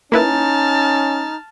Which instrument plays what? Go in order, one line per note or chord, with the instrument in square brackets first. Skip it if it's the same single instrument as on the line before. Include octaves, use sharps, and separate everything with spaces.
[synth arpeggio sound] A#3 E4 B4 [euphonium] C#4 [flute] D#4 [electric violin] A5 F6